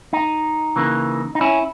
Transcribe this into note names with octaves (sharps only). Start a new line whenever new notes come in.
D#4
C#3 E3 A#3
D#4
C#4 E4